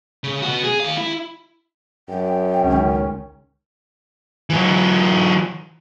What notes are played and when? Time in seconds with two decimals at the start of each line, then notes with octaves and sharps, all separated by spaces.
0.24 C#3
0.42 B2 F#4
0.63 G#4
0.80 D#3 F5
0.98 E4
2.09 F#2 G5
2.62 C#2 D#3 C#4
4.50 E3 F#3